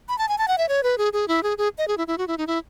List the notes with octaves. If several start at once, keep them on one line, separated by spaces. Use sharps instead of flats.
B5
A5
G#5
A5
F#5
E5
C#5
B4
G#4
G#4
E4
G#4
G#4
D#5
G#4
E4
E4
F#4
E4
D#4
E4